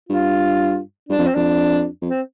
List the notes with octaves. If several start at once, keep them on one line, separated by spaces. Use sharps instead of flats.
G2 F4
G2 D4
F2
C4
F2 D4
F2
C4